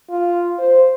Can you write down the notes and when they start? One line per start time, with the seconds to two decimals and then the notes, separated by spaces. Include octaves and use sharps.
0.10 F4
0.59 C5